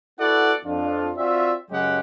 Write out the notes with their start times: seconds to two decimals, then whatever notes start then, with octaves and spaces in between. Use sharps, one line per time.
0.19 B3 E4 F#4 A4 D5 F#5
0.65 F2 D4 F4
1.16 C4 F4 F#4 D5 E5
1.70 F#2 C#3 F#3 G#3 G4 F#5